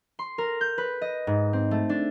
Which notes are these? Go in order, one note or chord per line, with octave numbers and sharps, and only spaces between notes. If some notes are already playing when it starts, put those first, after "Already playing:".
C6
A#4
G6
B4
D#5
G#2
C4
A3
D4